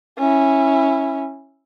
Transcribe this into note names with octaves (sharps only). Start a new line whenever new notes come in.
C#4 E4